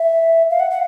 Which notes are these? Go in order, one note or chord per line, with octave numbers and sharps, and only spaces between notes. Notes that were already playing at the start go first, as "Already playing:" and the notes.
Already playing: E5
F5
F#5
F#5